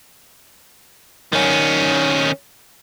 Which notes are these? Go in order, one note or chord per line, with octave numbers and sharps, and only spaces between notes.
D#3 C#4